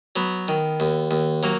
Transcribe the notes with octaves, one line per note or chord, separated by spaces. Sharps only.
F#3 B3
D#3
D#2
D#2
F#3 A#3